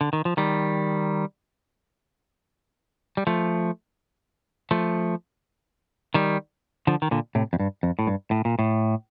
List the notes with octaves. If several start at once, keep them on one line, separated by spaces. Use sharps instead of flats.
D3
D#3
F3
D#3 G3
G3
F3 A3
F3 A3
D#3 G3
D3 F3
D#3
A#2 D3
A2 C3
F2
G2
F2
A2
G2
A2
A#2
A2